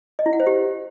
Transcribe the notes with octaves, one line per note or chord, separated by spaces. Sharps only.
D#5
E4
F#5
C5
G4